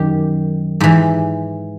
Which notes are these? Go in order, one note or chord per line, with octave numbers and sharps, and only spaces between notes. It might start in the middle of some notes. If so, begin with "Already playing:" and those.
Already playing: F#2 D#3 G4
G#2 E3 G4